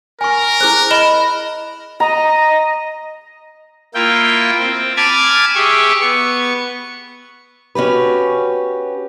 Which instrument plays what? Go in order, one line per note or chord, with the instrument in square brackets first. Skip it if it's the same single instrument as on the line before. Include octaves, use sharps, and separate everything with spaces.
[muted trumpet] A#4 [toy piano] G#5 C#6
[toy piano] E4 G#4 C5 [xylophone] F#6
[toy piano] D#5 [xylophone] B5 E7 G7
[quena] D#5 [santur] A#5
[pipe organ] A#3 E4 F4 G5
C4
G#5 A5 B5 D6 F6 G#6
G4 G#4 E5 C#6
B3 C#6
[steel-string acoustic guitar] C#4 F#4 G4 B4